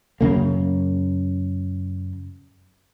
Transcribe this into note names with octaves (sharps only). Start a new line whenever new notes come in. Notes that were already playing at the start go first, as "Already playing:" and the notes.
F#2 C#3 A#3